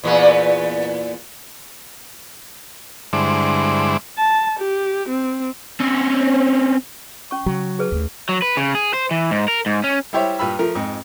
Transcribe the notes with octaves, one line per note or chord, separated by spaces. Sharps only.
E2 A#2 B3
G2 D3 G#3 E4 C5 D6
A5
G4
C4
C4 C#4
C#4 C#6
C#3 F#3
G#4 B4 A5
D#2 A3
F#3
B4
C#3
G#4
C5
E3
G#2
A#4
G#2
C#4
G3 E4 G4 C5 C#5 E5
G2 A#2 G4 B5 E6
F3 A3 A#4
F2 G#2